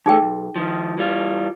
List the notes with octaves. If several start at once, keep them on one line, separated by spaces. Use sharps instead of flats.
E2 A3 D#4 G#4 G5
B1
D#3 F3
E3 G3 F4